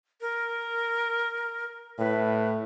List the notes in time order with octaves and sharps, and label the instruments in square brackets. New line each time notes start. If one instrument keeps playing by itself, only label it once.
[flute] A#4
[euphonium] A2 [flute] B4